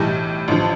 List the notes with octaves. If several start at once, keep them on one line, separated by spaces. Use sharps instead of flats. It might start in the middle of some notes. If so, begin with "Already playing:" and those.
Already playing: B1 A2 E3 G3
A1 G2 D3 F3